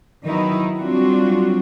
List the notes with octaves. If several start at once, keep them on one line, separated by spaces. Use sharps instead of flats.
D#3 F#3 B3 D#4 E4
F#3 G3 C4 D4 F4 F#4